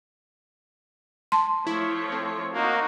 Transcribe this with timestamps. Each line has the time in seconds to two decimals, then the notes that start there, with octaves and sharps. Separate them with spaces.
1.32 A5 C6
1.67 F3 A3 E4 C#5
2.12 C4
2.53 A#3 D#4 F#4